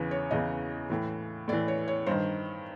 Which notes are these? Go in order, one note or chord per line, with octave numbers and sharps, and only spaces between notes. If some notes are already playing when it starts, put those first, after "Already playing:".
Already playing: E2 C#3 E3 B4
C#5
E2 C#3 E3 D#5
A2 E3
A2 D5
E3
C#5
C#5
G2 D#3 C5